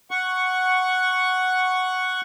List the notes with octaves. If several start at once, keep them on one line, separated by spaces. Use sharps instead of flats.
F#5 C#6